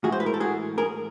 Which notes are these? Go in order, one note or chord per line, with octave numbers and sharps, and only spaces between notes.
A2 E3 G#3 F#4 G#4
C5
B4
A#4
A4
F#4 G#4
G#4 A#4